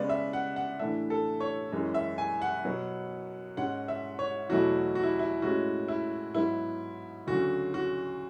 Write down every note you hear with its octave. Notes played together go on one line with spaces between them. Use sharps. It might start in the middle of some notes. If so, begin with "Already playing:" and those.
Already playing: C#3 G#3 B3 D5
E5
F#5
F#5
A2 E3 A3 D4 E5
A4
C#5
F#2 E3 G#3 C#4
E5
G#5
F#5
B2 F#3 B3
G#2 G#3 C#4 F#5
E5
C#5
E2 B2 F#3 A3 E4 F#4
F#4
E4
E4
A2 G#3 C#4 E4 F#4
E4
G#2 F#3 B3 E4
D2 C#3 F#3 F#4
F#4